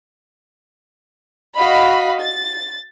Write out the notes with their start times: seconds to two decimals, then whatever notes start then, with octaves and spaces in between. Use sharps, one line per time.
1.55 F#4 D#5 F5 B5
2.20 A6